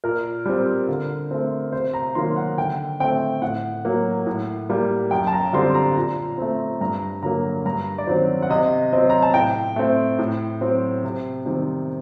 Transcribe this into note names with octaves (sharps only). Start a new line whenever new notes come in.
A#2 A#4
G3 C4
D3
A3 C4
C3 C5
A#5
D#3 F#3 A#3 C6
F#5
D3 G5
A3 C4 G5
A2 F#5
F#3 A#3
A2
G3 A#3
F#2 G5
A5
A#5
D3 G3 C4 C6
A#5
A#2
A3 C4
G2 A#5
D3 F#3 A#3 A#5
G2 A#5
D5
D#3 F#3 C4 C5
F#5
C3 D#5
F#3 C4 D#5
A#5
A5
A2 G5
A3 C4
A2
F#3 C4
C3
D#3 G3 C4